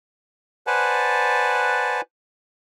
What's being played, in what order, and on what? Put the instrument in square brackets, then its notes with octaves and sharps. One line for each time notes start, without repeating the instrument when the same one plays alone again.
[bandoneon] B4 C5 D5 F#5 G#5 A5